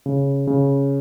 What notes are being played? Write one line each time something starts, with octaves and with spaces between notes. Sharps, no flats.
C#3
C#3